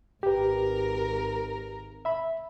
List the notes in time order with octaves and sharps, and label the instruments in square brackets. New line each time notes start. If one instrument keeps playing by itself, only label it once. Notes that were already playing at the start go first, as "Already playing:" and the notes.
[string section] G#1 A#4 [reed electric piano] G4 B4
[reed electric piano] E5 B5